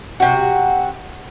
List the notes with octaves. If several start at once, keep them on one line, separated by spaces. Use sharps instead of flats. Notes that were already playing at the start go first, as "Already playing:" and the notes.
C3 F#4